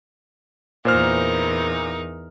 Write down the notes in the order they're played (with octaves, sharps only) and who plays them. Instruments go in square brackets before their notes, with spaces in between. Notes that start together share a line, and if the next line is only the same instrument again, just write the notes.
[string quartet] E2 D#4 A#4 [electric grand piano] A#2 C5 F6